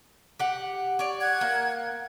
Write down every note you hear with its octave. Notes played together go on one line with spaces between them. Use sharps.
G4 F#5
C#5 D5
F#5 F#6 G#6
A#3